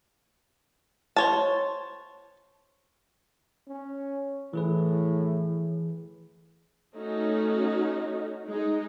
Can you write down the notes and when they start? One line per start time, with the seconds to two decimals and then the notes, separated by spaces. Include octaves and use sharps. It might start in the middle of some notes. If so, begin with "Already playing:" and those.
1.16 C5 C#5 A5
3.68 C#4
4.53 A2 E3 G#4 B4
6.96 A3 C#4 D#4 F#4
8.46 G#3 D#4